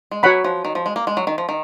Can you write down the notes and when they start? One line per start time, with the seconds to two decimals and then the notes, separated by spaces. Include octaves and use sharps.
0.11 G#3
0.23 F#3 F#4 C#5 F#5 B5
0.45 F3
0.65 D#3
0.75 F3
0.86 G#3
0.96 A#3
1.07 G#3
1.17 F#3
1.27 D#3
1.38 F3
1.49 D#3